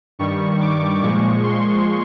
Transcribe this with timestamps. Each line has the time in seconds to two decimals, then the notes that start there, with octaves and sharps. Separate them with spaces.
0.19 G2 D#3 G3 C#6
0.61 D6
1.01 A#2 F3 G#3 C#6
1.43 C6